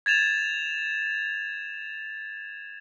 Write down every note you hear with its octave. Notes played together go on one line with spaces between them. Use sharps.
G#6 A6 E7 F7